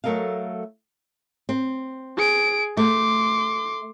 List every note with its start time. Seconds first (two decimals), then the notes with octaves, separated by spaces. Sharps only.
0.04 F#3 A3 A4 A#4 D#5 F5
1.49 C4
2.17 G#4 D7
2.77 A3 C6 D6